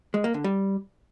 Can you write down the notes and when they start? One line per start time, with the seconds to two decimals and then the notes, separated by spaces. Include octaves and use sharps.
0.14 G#3
0.24 A#3
0.34 D3
0.44 G3